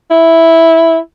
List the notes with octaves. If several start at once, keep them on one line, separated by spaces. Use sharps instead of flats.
E4